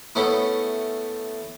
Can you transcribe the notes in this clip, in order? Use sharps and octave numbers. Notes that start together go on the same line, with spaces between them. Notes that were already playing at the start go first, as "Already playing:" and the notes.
A3 B3 C#4 E4